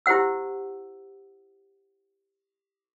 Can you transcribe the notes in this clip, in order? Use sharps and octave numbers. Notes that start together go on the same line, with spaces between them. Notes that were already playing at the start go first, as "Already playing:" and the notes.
E4 G4 C5 F#5 E6